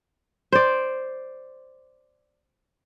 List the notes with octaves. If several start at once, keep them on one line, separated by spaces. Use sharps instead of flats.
C5 D5